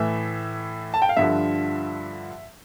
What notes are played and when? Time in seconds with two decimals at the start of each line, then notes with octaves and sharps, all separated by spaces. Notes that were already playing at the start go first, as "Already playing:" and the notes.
Already playing: A2 E3 A3 E5
0.94 A5
1.02 G5
1.09 F5
1.17 G2 D3 F3 E5